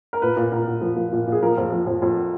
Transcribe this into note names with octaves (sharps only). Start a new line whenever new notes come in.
A#4
A#2 B4
A#2
A#2 A#4
A#2
F3
F3
A#2
A#2 G#4
F3 A#4
F2
F3
F2
F2